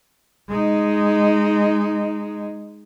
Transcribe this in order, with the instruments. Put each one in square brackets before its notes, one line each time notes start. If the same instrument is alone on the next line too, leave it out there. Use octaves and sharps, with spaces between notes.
[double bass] G#3 D#4